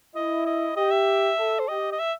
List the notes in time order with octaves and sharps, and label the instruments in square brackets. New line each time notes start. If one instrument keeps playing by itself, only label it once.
[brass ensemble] E4 [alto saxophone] D#5
[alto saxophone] D#5
[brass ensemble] G4 [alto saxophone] D#5
[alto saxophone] E5
[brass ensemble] A4
[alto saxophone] C5
[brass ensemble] G4 [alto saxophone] D#5
[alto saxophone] D#5
E5